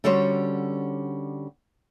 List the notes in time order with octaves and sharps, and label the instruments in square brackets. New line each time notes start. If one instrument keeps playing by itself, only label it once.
[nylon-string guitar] D3 G3 C#4 F#4 C5 C#5